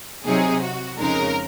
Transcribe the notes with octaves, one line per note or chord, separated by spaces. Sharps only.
C3 F#3 C4 D#4 G#4
F#4
F2 C#3 G#3 D#4 A#4